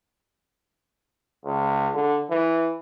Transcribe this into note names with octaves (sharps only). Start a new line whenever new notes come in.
C#2
D3
E3